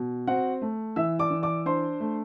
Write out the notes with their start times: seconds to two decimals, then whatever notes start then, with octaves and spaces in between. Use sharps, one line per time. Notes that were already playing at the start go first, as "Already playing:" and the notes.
Already playing: B2
0.27 C4 F#4 F#5
0.62 A3
0.96 E3 E5 E6
1.19 D5 D6
1.31 E3
1.42 D5 D6
1.66 D4 C5 C6
2.00 A3